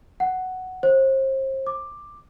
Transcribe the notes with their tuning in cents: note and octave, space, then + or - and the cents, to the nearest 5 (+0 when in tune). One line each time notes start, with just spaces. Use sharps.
F#5 +5
C5 +35
D6 +10